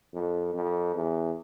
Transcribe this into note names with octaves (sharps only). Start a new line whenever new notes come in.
F2
F2
E2